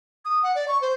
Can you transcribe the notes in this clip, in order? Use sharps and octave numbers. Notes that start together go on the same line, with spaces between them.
D#6
F#5
D5
C#6
C5